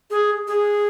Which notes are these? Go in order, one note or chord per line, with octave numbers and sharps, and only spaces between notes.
G#4
G#4